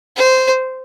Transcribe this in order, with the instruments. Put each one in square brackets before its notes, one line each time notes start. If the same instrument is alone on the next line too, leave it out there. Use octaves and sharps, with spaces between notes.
[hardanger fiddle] C5